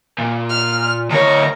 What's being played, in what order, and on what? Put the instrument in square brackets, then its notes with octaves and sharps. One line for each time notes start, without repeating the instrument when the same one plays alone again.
[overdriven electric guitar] A#2
[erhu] F6
[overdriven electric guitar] D2 C#5 [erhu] A#4